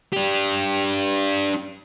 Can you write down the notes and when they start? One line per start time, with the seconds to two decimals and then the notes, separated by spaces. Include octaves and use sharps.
0.13 D4 G4